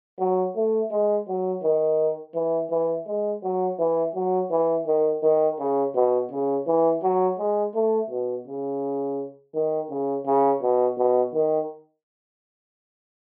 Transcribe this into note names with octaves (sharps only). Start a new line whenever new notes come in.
F#3
A3
G#3
F#3
D#3
E3
E3
G#3
F#3
E3
F#3
E3
D#3
D#3
C#3
B2
C#3
E3
F#3
G#3
A3
B2
C#3
D#3
C#3
C#3
B2
B2
D#3